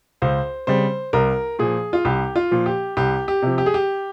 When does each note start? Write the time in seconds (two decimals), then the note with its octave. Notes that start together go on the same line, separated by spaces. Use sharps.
0.22 C#2 C5
0.67 C#3 G3 C4 C5
1.13 C2 A#4
1.59 A#2 F3 G#4
1.93 F4
2.05 C2 G4
2.36 F4
2.51 A#2 F3
2.66 G4
2.97 C2 G4
3.28 G4
3.42 C3 F3
3.58 G4
3.66 G#4
3.74 G4